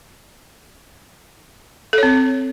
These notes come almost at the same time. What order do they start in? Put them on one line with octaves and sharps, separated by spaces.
A4 C#5 C4